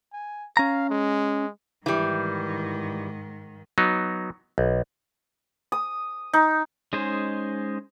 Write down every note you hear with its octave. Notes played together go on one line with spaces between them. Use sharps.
G#5
C#4 F5 A#5
G#3
G#2 D#3 E3 G3
F#3 B3 D#4
B1
D#6
D#4
G#3 C#4 D#4 G#4 C5